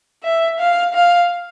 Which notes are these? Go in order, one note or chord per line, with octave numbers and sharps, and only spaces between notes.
E5
F5
F5